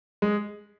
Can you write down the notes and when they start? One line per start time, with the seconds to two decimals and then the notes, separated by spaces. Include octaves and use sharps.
0.22 G#3